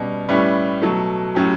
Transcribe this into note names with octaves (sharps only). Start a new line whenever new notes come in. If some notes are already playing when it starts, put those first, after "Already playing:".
Already playing: B2 G3 C#4
A2 G3 C#4 E4 B4
B2 F#3 A3
A2 F#3 C#4 G4